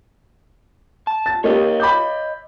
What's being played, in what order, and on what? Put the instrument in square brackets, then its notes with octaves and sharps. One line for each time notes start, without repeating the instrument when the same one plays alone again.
[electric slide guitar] A5
[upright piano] A6
[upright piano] A#3 D#4 G4 [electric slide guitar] C#5 D#5
[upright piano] B5 D6 G6